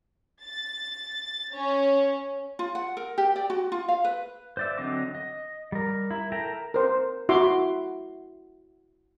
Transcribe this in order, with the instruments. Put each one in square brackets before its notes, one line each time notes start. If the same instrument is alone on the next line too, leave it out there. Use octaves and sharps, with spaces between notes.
[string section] A6
C#4
[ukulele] F4
F#5
A#4
G4
D5
F#4
F4
F5
B4
[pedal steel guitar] C5 D5 E5
D3 F#3 C4 D#5 D6
D#5
G3 A#4
E4
A4 A#4 E5 G5 A#5
[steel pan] A#4 C5
E4 F#4 E5 C6 D6